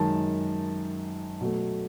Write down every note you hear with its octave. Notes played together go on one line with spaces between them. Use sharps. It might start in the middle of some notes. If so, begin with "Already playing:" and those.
Already playing: F#2 D#3 G#3 A5
B2 F#3 A3